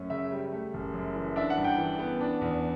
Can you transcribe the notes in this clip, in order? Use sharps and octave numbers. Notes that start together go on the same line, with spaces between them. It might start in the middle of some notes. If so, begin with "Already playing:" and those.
Already playing: F#2 A3 C#4
C#3 E5
G3
A3
F#1
F#2
E3
D4 E5
F#5
G2
G5
E3
B3
D4
E2